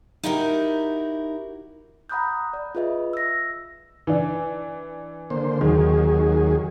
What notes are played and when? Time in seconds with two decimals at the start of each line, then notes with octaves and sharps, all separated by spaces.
0.23 D#4 E4 F#4 G4 A#4
2.09 F#5 A#5 B5 D#6 F#6 G6
2.53 D5
2.75 F4 G#4 B4 D#5 E5
3.13 E6 A#6
4.07 E3 D4
5.30 D3 A#3 C5
5.61 D#2 D#3 F#3 G#4